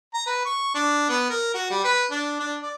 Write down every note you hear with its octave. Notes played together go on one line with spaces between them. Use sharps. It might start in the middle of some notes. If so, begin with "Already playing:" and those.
A#5
B4
C#6
D4
B3
A#4
F#4
G3
B4
D4
D4
D5